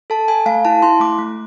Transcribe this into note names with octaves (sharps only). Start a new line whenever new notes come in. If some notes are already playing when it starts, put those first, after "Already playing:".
A4 A5
A4 G#5
A3 F5
E4 A5
E4 C6
A3 D6
A3